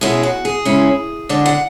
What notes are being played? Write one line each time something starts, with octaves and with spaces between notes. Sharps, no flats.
B2 G#3 C#4 E4 G#4
F#4
G#4
C#3 G#3 C#4 E4
D3 G#3 D4
F#5